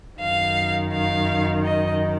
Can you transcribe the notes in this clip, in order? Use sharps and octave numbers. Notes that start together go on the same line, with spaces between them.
F#2 D#3 F5
F5
D#5